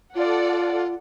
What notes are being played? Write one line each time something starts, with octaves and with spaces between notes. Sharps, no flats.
F4 A4 D5 F#5